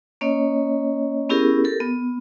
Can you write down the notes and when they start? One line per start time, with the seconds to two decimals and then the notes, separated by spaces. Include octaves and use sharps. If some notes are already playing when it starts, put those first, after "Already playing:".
0.21 A#3 C#4 C#5 D#5
1.29 B3 C#4 E4 G4 G#4 A#4
1.64 G4 A4 A#4
1.80 B3